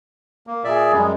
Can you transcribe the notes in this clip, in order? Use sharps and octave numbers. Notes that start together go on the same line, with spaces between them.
A#3
A#2 G#4 D5 E5
F#2 G3 G#3